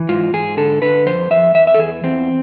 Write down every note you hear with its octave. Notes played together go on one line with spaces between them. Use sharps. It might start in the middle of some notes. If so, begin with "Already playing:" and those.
Already playing: E3
G#2 F4
G#2 G#4
D3 A4
D3 B4
F2 C5
F2 E5
E2 E5
E5
A4
E2 G#4
E2 C4